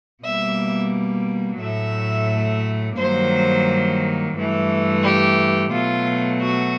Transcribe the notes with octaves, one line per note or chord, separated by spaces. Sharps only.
B2 G3 A#3 E5
A2 F#3 A3 E5
G2 D#3 F#3 A#3 C5
G2 E3 A3
G4
B2 F#3 A3 F4
F#4